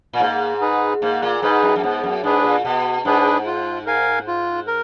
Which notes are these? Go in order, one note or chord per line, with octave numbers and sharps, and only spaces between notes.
A#2
G#2 A#3
D#4 G#4 B4
G#2 A#3
A#2
G#2 D#4 G#4 B4
F#2
F#2
G#2 B3
F#2
G#2 D4 G#4 B4
A#2
B2 B3
G#2 D4 G#4 B4
F4
A#4 F5 G#5
F4
A#4